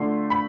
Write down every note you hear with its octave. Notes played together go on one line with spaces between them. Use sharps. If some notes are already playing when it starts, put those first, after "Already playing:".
Already playing: D3 A3 D4 F4 C6
B5